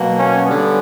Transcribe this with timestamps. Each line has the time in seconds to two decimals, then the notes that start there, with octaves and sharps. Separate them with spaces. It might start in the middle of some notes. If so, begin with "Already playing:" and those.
Already playing: B2 F#3 A#3
0.17 C#4
0.45 D3 G3 B3